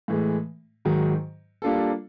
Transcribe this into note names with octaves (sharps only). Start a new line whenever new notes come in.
A2 E3 G#3
G#2 D#3 F#3
G3 A#3 D4 F4 A4